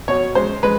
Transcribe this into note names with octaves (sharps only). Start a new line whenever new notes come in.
B2 C#5
G#3 C5
G#3 B4